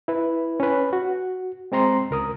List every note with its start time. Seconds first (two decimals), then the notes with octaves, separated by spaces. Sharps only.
0.08 E4 B4
0.60 C#4 B4
0.93 F#4
1.72 G#3 C4 A#5 C6
2.11 C#2 A#4 D#6